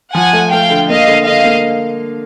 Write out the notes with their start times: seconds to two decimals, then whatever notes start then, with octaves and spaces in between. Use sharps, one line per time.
0.15 F3 F#5 G#5
0.33 A3
0.52 A3 F5 G5
0.70 D3
0.89 A#3 D#5 F5
1.07 D3
1.26 D3 D#5 F5
1.44 A#3